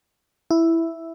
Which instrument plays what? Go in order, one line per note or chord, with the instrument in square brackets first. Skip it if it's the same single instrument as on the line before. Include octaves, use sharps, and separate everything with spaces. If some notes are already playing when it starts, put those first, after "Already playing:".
[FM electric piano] E4